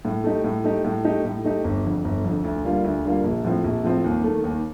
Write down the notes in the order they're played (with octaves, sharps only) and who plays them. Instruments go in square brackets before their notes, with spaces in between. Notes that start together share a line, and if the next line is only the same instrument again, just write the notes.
[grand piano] A2
A3 D#4 G4
A2
A3 D#4 G4
A2
A3 D#4 G4
A2
A3 D#4 G4
G1
F2 D3
G1
F2 D3
D2
D3 G3 A#3 F4
D2
D3 G3 A#3 F4
A#1
A2 F3 C4
A#1
A2 F3 C4
D#2
D#3 A3
D#2